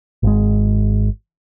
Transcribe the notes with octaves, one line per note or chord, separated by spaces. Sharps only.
G#1 G#3